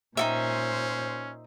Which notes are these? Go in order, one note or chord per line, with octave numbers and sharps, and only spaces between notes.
A#2 C#4 D#4 F#4 C5 E5